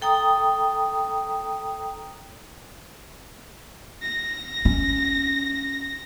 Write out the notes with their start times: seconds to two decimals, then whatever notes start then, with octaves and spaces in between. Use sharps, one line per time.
0.02 A4 G5 A#5 D#6
4.02 A#6
4.65 C#4